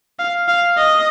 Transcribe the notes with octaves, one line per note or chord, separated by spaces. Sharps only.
F5
F5
D#5